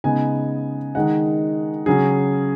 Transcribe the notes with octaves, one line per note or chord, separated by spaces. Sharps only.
C#3 G#3 B3 D#4 G#5
D#3 G#3 D#4 F#5
C#3 F#3 C#4 G#4